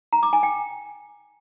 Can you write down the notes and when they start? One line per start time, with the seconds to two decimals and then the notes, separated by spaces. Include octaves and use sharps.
0.13 A#5
0.23 D6
0.33 G#5
0.43 G5